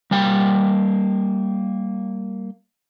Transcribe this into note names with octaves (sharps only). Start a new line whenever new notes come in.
G3 A#3 G5